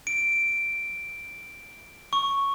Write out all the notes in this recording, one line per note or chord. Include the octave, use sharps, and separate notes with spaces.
D7
C#6